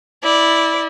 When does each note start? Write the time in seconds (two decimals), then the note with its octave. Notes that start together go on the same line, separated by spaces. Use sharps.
0.23 E4 D5